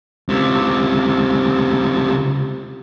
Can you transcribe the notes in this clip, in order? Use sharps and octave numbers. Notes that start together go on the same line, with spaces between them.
C#2 C3